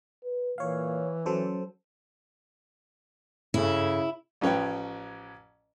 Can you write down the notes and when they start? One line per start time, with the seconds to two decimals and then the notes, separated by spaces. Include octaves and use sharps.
0.23 B4
0.58 A#2 E3 C#5 F5
1.26 F#3 C#4 A4 C5
3.54 G2 C#3 E4 A4
4.41 A1 F3 C#4 B4 G5